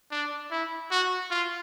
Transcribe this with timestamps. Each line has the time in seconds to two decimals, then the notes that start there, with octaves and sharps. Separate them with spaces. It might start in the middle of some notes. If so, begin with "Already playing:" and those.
0.12 D4
0.51 E4
0.91 F#4
1.31 F4